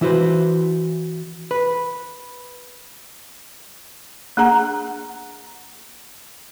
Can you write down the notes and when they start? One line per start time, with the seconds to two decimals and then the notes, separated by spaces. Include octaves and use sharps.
0.01 E3 E4 F#4 B4 C5
1.51 B4
4.37 A#3 D4 G#4 F#5 A#5